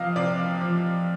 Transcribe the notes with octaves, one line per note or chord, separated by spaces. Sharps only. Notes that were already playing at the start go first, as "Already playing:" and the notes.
Already playing: C3 F3 D#5 F5
C3 D5
F3